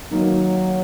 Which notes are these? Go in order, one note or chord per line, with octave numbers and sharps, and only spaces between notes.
D#3 F#3 A#3 D#4